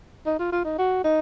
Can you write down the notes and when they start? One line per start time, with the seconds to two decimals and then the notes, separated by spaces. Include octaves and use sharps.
0.26 D#4
0.39 F4
0.52 F4
0.64 D#4
0.78 F#4
1.04 D#4